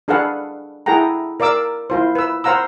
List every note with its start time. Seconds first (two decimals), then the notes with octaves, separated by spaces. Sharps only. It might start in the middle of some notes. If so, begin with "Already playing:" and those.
0.08 D4 G#4 A4 B4 F5 F#5
0.86 E4 G#4 A4 F#5 G5 A#5
1.40 A#4 D5 F5 D6 E6
1.90 E4 F4 C5
2.15 B4 E6
2.44 C5 F5 F#5 A#5 E6